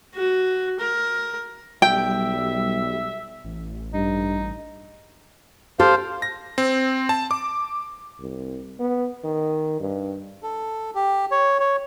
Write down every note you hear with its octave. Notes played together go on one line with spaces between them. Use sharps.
F#4
A#4
B1 G3 E5 G5
A1
G2 D#4
G4 A4 C5 F5
A#6
C4
A5
D6
C2
B3
D#3
G2
A4
G4
C#5
C#5